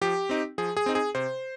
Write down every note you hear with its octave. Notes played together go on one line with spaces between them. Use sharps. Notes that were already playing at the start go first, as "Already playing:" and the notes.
F3 G4
C4 D#4
F3 G#4
G#4
C4 D#4
G#4
C3 C5